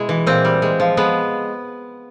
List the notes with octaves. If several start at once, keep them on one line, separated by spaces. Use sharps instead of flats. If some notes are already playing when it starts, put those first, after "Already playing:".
Already playing: B2 G#3 E4
E3
A#2 C4
G3
G#3
F3
G#3 B3